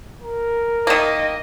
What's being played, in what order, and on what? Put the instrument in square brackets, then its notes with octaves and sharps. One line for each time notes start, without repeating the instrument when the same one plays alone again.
[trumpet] A#4
[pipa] D#3 A#3 [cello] D#5